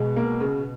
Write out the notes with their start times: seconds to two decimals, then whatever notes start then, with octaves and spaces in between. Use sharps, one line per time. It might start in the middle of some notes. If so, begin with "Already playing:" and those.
Already playing: B2 G#3
0.16 A#3
0.40 C#3